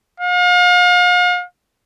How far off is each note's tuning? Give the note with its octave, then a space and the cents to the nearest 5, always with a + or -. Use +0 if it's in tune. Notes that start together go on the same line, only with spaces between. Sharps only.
F5 +40